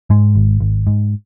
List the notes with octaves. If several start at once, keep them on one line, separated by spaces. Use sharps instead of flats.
G#2 G#3
G#1
G#1
G#2